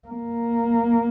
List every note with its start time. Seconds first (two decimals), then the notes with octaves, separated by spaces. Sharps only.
0.08 A#3